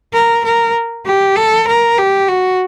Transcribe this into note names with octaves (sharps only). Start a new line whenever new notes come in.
A#4
A#4
G4
A4
A#4
G4
F#4